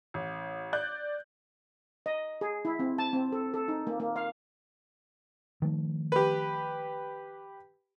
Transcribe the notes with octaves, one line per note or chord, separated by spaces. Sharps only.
A1
D5 F#6 G6
D#5
G#4
E4
C4
A5
C4
A4
A4
D#4
A#3
A#3
F5
D#3 F3 A3
G4 B4